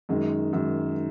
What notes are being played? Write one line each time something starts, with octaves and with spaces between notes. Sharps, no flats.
F#2 D#3 G#3
F#2 D#3 G#3